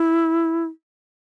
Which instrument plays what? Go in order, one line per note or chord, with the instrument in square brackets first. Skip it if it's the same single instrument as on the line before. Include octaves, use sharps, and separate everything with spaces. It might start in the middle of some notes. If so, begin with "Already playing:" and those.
Already playing: [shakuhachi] E4